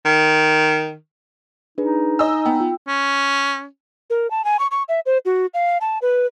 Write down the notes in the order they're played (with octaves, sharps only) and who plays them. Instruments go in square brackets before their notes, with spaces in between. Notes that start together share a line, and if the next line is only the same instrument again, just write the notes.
[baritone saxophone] D#3
[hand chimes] D4 G#4 B4 [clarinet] D#4
[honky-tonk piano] D#5 E6 [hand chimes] G#5
[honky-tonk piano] B3 [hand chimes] G5
[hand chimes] F4
[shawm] C#4
[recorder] A#4
A5
G#5
C#6
C#6
E5
C5
F#4
F5
A5
B4